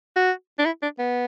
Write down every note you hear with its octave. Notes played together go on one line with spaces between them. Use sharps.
F#4
D4
E4
D4
B3